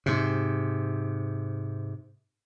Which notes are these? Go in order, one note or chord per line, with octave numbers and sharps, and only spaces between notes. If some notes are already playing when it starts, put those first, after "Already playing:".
G#2 C3